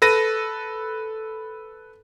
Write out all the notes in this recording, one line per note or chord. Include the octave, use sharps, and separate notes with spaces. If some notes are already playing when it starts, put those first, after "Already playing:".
A4 B4 A#6 D#7